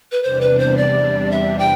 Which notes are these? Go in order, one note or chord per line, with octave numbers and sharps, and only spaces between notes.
B4
E2 C3 G3 D4 C5
B4
C5
D5
E5
G5